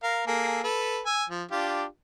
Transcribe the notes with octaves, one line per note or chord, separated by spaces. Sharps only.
A#4 F5
A#3 G#4 A4
A4 B4
G#5 E6
F3
D4 F4 G4